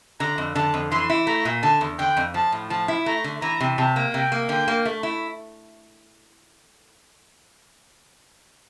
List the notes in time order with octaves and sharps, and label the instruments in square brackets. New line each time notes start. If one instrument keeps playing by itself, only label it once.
[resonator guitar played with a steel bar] D3 [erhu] A#5
[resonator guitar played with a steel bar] F2
[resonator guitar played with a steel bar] D3 [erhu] A5
[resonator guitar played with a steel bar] F2
[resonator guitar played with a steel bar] E3 [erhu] C6
[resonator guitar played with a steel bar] E4
[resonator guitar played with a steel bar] A3 [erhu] A#5
[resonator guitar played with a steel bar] A#2
[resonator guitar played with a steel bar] D3 [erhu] A5
[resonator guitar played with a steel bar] E2
[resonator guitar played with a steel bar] D3 [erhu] G5
[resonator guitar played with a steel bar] F2
[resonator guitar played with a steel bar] F3 [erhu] A5
[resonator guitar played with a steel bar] A2
[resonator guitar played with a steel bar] F3 [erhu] A5
[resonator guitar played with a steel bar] E4
[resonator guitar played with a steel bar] A3 [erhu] A#5
[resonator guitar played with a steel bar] D3
[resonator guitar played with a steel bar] E3 [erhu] A#5
[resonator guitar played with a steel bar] C3
[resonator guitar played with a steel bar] C3 [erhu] A5
[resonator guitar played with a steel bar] A#3
[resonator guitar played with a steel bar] C3 [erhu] G5
[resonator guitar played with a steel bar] A#3
[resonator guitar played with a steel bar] D3 [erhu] G5
[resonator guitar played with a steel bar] A#3
A3
E4